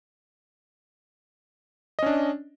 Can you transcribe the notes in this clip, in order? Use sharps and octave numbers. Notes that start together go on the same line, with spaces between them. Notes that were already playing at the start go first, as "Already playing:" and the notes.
C#4 D4 D#5